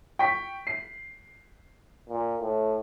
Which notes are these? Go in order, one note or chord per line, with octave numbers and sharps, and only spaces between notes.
G5 C#6 B6
C7
A#2
A2